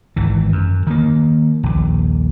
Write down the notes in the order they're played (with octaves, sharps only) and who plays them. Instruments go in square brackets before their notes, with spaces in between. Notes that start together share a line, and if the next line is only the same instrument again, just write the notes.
[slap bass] G#1 E3
F#2
D#3 A#3
A#1 D#2